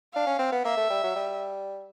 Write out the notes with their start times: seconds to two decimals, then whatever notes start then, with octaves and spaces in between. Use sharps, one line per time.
0.13 D4 F5
0.27 C#4
0.39 C4
0.52 B3
0.65 A#3 E5
0.77 A3
0.90 G3
1.04 F#3
1.16 G3